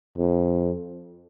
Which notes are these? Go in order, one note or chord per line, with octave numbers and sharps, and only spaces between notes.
F2